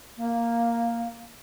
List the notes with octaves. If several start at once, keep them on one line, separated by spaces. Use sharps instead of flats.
A#3